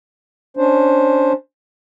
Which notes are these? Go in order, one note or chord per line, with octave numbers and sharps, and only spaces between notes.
C#4 D4 C5